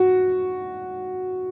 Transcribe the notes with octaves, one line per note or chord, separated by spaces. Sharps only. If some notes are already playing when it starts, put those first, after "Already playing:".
Already playing: F#4